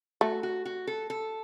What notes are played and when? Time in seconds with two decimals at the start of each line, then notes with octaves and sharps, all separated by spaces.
0.21 A3 F#4
0.43 F#4
0.65 F#4
0.87 A4
1.10 A4